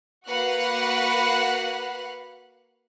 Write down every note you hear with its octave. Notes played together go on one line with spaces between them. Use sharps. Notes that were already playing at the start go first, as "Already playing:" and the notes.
A#3 F#4 B4 F5 F#5 F#6